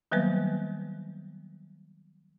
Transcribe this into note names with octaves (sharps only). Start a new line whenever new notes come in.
D#3 F#3 G3 A#3 B3 B4